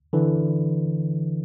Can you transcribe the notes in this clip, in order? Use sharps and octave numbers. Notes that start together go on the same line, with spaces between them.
D3 E3